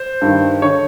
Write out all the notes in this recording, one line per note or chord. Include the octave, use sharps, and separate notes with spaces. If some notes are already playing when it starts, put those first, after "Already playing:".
Already playing: C5
G2 D#3
D3 C#5